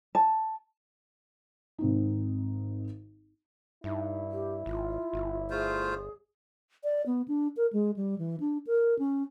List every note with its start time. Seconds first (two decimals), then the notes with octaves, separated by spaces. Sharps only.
0.15 A5
1.78 G#1 C4 D#4
3.84 G2 D#4 E4
4.31 G4
4.66 G#1 F4
5.13 G1
5.50 A3 F4 G#4 C5
6.84 D5
7.06 B3
7.28 D4
7.57 A#4
7.73 G#3
7.96 G3
8.19 E3
8.40 D4
8.67 A#4
8.99 C#4